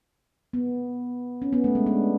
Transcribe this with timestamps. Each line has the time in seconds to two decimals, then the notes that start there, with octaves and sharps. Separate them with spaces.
0.53 B3
1.42 C#4
1.53 B3
1.64 A3
1.75 G#3
1.86 D4